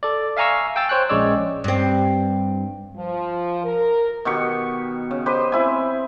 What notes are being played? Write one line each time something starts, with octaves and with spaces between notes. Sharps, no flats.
A4 D5
E5 F5 G#5 A#5 C#6 E6
G5 G#5 E6 A6
C5 C#5 G5 F#6
A#1 G#3 C#4 C#5 D5 E6
G2 C4
F3
A#4
B2 D#3 G4 C#6
C#3
G4 B4 C5 D#5
C4 E4 G#5